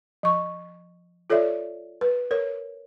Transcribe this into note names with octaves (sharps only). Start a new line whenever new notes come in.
F3 C#6
F4 A4 C#5 D5 E5
B4
A#4 C#5